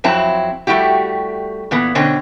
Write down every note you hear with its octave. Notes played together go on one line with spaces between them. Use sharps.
F2 F#3 C4 E4 A5
G3 A3 E4 F#4 G4
A#2 E3 B3
B2 D3 C4 C#4